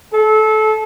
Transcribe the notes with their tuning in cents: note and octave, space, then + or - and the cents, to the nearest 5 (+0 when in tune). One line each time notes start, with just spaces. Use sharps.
A4 -25